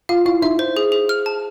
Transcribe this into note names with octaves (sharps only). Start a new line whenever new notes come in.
F4 F5
E4 F5
D#4 E5
C5
G#4
G#4
F6
A5